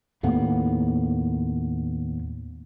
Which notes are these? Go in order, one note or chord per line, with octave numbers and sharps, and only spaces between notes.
D#2 A2 A#3 B3